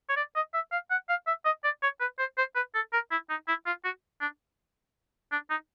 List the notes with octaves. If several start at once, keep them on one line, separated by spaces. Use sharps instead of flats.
C#5
D5
D#5
E5
F5
F#5
F5
E5
D#5
D5
C#5
B4
C5
C5
B4
A4
A#4
E4
D#4
E4
F4
F#4
D4
D4
D#4